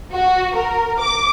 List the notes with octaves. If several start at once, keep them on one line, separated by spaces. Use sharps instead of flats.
F#4
A#4
D6